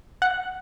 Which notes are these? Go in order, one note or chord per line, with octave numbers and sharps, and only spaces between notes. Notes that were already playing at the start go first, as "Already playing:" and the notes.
F#5